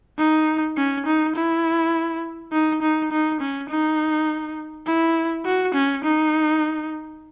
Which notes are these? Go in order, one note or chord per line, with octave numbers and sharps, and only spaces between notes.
D#4
C#4
D#4
E4
D#4
D#4
D#4
C#4
D#4
E4
F#4
C#4
D#4